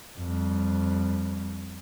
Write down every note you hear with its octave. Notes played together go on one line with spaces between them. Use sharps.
F2 G3